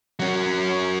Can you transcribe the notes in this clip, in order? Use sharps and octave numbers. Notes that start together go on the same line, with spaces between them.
F#3 C#4